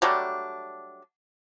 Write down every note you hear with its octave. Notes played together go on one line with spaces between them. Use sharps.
F#3 G3 A3 D4